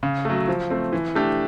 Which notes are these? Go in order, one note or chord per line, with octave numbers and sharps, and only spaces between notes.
C#3
F#3 A3
F3
A3 C4
E3
A3 D4 G4